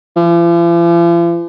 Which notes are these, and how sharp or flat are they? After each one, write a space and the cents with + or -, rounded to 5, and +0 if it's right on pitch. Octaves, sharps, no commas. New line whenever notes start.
F3 -45